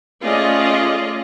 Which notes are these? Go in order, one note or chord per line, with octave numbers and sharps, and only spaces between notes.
A3 C#4 F4 G#4 D5 D#5